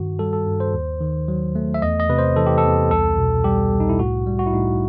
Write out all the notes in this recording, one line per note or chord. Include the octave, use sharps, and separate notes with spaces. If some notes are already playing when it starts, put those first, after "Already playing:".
Already playing: G2 D#3 F#4
G3 A4
A4
G2
C5
D#2
D#3
F#3
A3
E5
E2 D#5
D#5
C3 B4
C5
E3 A4
G4
A4
E2
C2 A4
B2
G3 G4
C2
D#4
E4
A2 F#4
G3
F#4
E4
A2 D#4